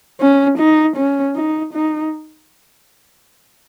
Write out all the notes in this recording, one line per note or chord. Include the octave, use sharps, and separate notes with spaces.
C#4
D#4
C#4
D#4
D#4